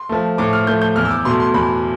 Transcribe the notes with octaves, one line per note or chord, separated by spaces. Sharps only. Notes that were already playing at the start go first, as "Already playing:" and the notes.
Already playing: C6
F3 A3
A2 D6
F6
F3 A3 G6
G6
E2 F6
E6
D6
B2 A3 C6
C6
E2 B5